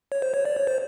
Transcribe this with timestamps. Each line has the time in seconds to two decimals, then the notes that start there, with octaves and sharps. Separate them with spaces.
0.12 C#5
0.22 C5
0.34 C#5
0.45 D5
0.57 C#5
0.67 C5